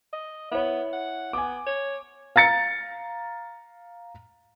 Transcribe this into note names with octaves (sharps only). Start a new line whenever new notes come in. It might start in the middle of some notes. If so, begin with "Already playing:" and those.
D#5
B3 E4 C#5
F#5
B3 G#5 D6
C#5
F5 A#5 A6 C#7